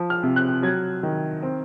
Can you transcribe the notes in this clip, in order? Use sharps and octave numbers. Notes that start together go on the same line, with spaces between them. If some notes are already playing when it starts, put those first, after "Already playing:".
Already playing: F3
F6
C3
F#6
F#3 G#6
D#3
C4